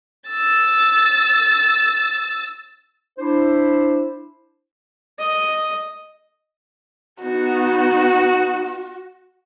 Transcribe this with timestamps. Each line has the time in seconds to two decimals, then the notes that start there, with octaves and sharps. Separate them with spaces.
0.29 E6 A6
3.18 D4 E4 C5
5.19 D#5
7.22 B3 D#4 F#4